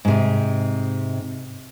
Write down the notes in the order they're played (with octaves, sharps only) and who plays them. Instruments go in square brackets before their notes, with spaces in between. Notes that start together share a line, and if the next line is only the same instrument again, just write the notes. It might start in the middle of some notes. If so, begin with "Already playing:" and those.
[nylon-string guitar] G#2 C3